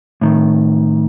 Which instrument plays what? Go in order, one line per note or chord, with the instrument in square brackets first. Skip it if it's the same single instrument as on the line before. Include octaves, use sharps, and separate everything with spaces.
[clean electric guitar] A2 D#3